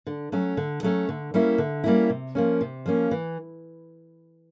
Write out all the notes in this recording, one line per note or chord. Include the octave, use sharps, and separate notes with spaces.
D3
F#3 A3 C#4
D3
F#3 A3 C#4
D3
G3 A#3 C#4 E4
D3
G3 A#3 C#4 E4
C3
F3 A#3 C#4
C3
F3 A#3 C#4
E3